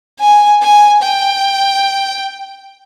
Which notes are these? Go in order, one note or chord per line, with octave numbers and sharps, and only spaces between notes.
G#5
G#5
G5